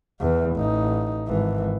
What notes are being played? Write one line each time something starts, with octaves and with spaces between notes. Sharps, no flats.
E2 E3
A1 D#4
G#1 E3